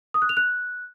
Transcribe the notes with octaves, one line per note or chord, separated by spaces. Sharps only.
D#6
F#6
F7
F#6